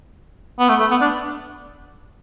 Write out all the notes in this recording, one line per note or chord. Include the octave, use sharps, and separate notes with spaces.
B3
A3
A3
B3
D4